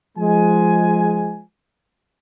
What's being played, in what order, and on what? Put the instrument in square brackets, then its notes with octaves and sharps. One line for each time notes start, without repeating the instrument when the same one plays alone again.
[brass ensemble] F3 G#3 G#5